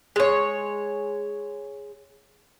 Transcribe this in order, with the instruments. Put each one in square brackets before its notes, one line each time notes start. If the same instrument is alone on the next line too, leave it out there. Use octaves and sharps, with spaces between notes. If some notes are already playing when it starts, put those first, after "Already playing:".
[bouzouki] G#3 C#5